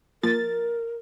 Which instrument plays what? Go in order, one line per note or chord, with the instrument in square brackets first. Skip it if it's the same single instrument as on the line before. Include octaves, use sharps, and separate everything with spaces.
[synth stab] F3 A#3 A6 [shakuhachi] A#4